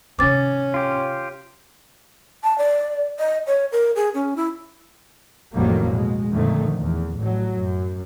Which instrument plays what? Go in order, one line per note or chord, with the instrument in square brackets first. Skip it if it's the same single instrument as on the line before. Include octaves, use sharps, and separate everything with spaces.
[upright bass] C3 D#3 [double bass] C#4 [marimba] D6 A6
[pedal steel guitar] F4 G4
[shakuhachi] A5
D5
D#5
C#5
A#4
G#4
C#4
E4
[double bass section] A1 F2 D#3 F#3 G3 A#3
B2 G#3
F2 A#2 D3 D#3 A3
E2
A1 F#3
F#2